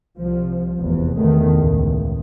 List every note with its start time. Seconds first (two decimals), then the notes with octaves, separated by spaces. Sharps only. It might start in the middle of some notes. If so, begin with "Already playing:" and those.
0.17 C2 F3
0.80 F1 E2
1.16 E2 D#3 A3
1.56 C#2 A2